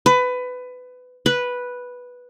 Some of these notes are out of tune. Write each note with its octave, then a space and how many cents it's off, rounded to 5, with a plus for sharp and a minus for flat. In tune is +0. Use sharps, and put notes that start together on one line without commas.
B4 +20
B4 -5